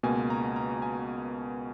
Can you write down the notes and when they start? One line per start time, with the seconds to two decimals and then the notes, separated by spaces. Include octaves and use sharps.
0.03 C#2 B2 A#3 G#5
0.30 A#5
0.56 A#5
0.82 G#5